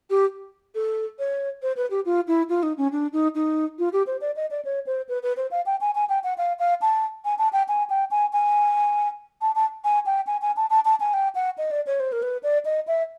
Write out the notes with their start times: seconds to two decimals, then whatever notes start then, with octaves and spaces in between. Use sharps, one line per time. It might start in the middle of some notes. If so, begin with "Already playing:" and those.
0.10 G4
0.75 A4
1.19 C#5
1.62 C5
1.76 B4
1.90 G4
2.05 F4
2.27 E4
2.49 F4
2.63 D#4
2.77 C#4
2.92 D4
3.13 D#4
3.35 D#4
3.79 F4
3.93 G4
4.07 C5
4.21 D5
4.36 D#5
4.51 D5
4.65 C#5
4.86 C5
5.09 B4
5.23 B4
5.37 C5
5.51 F5
5.66 G5
5.81 G#5
5.95 G#5
6.09 G5
6.24 F#5
6.38 F5
6.59 F5
6.81 A5
7.25 G#5
7.38 A5
7.53 G5
7.68 G#5
7.90 G5
8.11 G#5
8.33 G#5
9.41 A5
9.55 A5
9.84 G#5
10.06 G5
10.27 G#5
10.41 G#5
10.56 A5
10.70 A5
10.85 A5
11.00 G#5
11.13 G5
11.35 F#5
11.58 D#5
11.71 D5
11.87 C#5
12.00 C5
12.12 A#4
12.22 B4
12.43 D5
12.65 D#5
12.87 E5